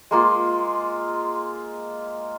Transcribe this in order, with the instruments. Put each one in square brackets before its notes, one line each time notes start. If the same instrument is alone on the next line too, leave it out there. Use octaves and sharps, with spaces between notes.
[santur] G#3 A#3 F4